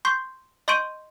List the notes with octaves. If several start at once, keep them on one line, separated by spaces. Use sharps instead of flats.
C6 C#6 G6 C7
D#5 C6 C#6 G6 D7 D#7